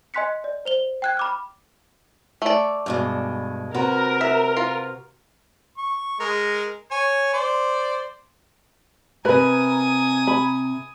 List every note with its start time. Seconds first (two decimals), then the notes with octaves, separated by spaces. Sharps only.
0.14 D#5 G#5 C6 F#6 B6 C#7
0.44 D5
0.65 C5 F7 G7
1.02 G5 F#6 G#6
1.17 B5 D6 F6
2.42 A3 D5
2.86 G2 B2 G#3
3.74 C3 F#4 A#4 B4
4.21 E5
4.57 F4
5.77 C#6
6.20 G#3 A#4
6.91 C#5 G#5
7.33 C5 D5
9.25 C3 A#4 B4 G#5 A#5 B5 D#6
10.27 B5